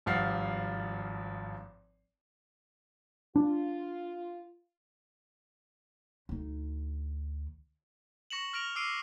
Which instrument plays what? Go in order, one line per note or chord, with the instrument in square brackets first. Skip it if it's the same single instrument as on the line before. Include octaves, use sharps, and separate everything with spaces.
[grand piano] G#1 G2 F3 F#5 F6 C7
[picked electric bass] D4 [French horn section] F4
[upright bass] D2 D#4
[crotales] C#6 A#6 C#7 E7 F#7
F6 A#6 D7 F7
D6 E6 C7 D7 D#7